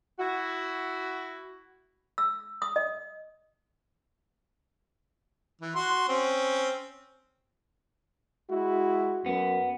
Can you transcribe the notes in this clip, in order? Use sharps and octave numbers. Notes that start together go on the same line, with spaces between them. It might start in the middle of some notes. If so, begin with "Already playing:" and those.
E4 F#4
E6
D#6
D#5
E3
F#4 C6
C4 C#4
G#3 E4 F#4
F#2 B3